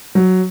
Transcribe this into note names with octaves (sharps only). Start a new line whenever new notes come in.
F#3